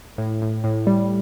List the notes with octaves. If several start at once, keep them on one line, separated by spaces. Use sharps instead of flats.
A2
A2
A2
G3